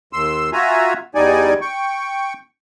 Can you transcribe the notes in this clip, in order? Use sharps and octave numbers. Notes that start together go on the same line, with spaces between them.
D#2 C6 E6
F4 F#4 E5 G#5 A#5
E2 G3 D#4 D5 G#5
G5 C#6